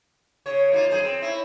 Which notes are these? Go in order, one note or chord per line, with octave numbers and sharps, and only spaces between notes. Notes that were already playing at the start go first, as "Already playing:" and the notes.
C#3 C#5
A#3 E4 F4
F#2 G#4 C5
C4
C#4 E4